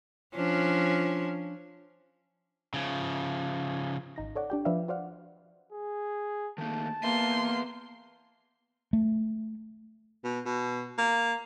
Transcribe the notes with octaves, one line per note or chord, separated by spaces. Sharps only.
F3 C#4 D4
C#3 F3
G#1 D#4 A#6
A4 C#5 D5 F#5
D4 G4 G5
F3 D4 B4 D5 E5 F5
F#4 C5 D5 F5 F#5
G#4
D#3 A3 A#3 A5
A#3 B3 B4 E5 C6
A3
B2
B2
A#3